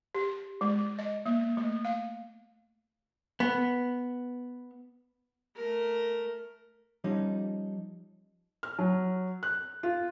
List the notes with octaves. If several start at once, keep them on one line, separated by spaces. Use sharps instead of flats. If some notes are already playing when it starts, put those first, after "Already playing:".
G4
G#3
D#5
A#3
A3
F5
B3
A3 A#4
F3 G3 C#4 D#4
F6
F#3
F#6
F4